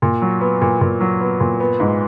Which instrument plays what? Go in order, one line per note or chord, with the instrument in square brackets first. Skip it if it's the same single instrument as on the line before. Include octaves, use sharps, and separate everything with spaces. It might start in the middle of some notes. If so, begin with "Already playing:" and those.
[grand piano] A#2
F#3
B3
A#2
A#2
F#3
B3
A#2
B3
G#2